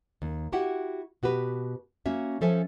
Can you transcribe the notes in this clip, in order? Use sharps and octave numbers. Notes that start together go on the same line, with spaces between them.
D#2
E4 F#4 G4 E5 F#5
B2 F#4 G4 B4
A#3 C#4 F#4 E5
F3 C#4 A4 C5 E5 G#5